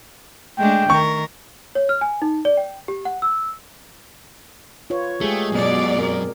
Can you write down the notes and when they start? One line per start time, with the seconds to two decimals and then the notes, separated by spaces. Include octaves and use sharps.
0.58 G#3 A3 D4 G5
0.90 D#3 A#4 C#6
1.75 C#5
1.89 F6
2.01 G#5
2.22 D#4
2.45 D5
2.57 G5
2.88 G4
3.05 F#5
3.22 E6
4.90 F4 B4 C#5
5.21 G#3 A3 G4 G#4
5.52 F#2 B2 D5
5.97 C4 A#4